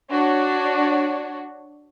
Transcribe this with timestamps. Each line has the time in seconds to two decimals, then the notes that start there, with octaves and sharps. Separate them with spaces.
0.11 D4 F#4 C#5